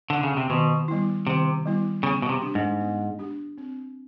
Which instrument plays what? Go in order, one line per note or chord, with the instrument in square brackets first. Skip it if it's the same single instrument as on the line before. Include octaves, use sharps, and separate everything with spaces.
[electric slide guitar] D3
C#3
C3
[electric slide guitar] B2 [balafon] D#3
[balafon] G3 B3 E4
[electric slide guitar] C3 [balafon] D#3
[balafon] G3 B3 E4
[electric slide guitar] C#3 [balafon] B3
[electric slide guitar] B2
C3
[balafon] D4 G4
[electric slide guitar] G#2
[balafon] B3
D4 G4
C4